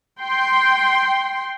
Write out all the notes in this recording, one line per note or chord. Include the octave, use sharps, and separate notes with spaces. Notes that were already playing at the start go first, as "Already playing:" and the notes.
G5 C6